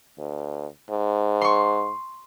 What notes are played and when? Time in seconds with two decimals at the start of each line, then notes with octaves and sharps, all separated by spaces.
0.18 D2
0.91 G#2
1.41 C6 C#6